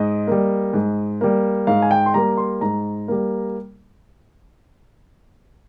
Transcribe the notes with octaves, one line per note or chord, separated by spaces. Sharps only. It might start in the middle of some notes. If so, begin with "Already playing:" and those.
Already playing: G#2 D#5
G3 A#3
G#2
G3 A#3
G#2 F5
G#5
G5
C6
G3 A#3 A#5
C6
G#2 A#5
G3 A#3